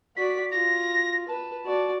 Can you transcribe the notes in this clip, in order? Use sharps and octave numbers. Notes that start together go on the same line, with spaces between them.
F#4 D5 B6
F4 A#6
B4 A5
F#4 D5